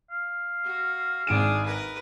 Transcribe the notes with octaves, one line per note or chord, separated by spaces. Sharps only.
F5
F#4
G#1 D4 G#4 D7 E7
A#4 B4